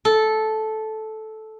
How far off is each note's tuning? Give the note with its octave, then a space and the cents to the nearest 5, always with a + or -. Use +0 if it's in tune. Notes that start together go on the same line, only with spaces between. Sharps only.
A4 -10